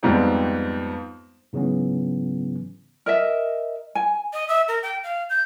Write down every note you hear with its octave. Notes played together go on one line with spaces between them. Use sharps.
F2 G#2 G3 B3 C4 D#4
G#2 C#3 E3 F#3 B3 C#4
A#4 D#5 E5
G#5
D#5
E5
A#4
G5
F5
G6